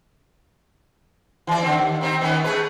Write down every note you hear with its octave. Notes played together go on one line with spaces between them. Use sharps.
E3 D5
D3 D#3 C4
D#2
D#3 C4 D#4
D#3 B3 C#4
A3 G#4 B4